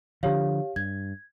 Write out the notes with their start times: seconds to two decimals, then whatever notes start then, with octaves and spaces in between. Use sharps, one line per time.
0.23 D3 F3 G4 C#5 F5
0.76 G2 G#6